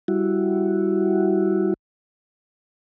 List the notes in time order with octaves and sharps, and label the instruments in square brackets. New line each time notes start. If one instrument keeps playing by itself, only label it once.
[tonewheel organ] G3 E4 F#4